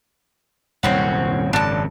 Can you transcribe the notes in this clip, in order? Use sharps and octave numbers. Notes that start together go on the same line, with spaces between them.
D#1 C2 F#2 C4 C#4 F#4
G#1 F#2 C#3 D4 A5